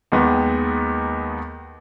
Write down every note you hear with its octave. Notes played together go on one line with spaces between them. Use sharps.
D#2 D#3 G#3 B3